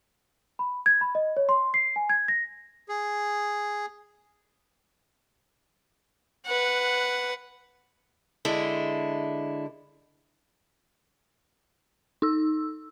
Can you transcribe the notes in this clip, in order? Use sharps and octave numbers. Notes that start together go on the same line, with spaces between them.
B5
G#6
B5
D#5
C#5
C6
C7
G#5
G#6
A#6
G#4
B4 F#5
D3 G#3 E4
D#4 E6